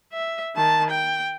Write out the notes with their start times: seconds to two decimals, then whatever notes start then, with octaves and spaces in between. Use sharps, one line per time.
0.13 E5
0.56 D#3 A5
0.91 G5